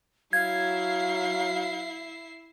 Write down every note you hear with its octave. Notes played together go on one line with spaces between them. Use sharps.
F#3 E4 F5 G#6 C7